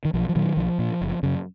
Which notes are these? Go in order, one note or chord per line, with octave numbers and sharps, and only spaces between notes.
D#3
B1 F3
F3
A#2 D#3 F#3
B1 F3
A#2
F#1
F#2 C#3